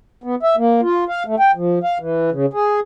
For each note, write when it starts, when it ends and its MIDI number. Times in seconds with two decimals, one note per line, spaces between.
0.24 0.35 59
0.43 0.56 76
0.57 0.81 58
0.82 1.04 65
1.08 1.23 77
1.26 1.36 57
1.40 1.51 79
1.55 1.79 53
1.83 1.98 77
2.00 2.30 52
2.31 2.46 49
2.53 2.80 68